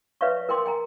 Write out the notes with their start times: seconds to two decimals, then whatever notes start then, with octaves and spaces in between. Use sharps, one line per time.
0.21 B4 C#5 D5 E5 F5 C#6
0.49 A#4 G5 C6 D6
0.65 G5 G#5 A#5